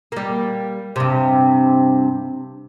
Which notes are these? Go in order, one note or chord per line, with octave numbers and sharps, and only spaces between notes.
G3 A#3
G2 C3